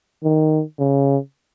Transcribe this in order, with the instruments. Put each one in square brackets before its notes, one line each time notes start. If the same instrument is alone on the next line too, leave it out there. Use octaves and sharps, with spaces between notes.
[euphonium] D#3
C#3